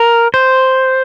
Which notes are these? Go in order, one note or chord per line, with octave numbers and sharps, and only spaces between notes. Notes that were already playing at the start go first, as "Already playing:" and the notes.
Already playing: A#4
C5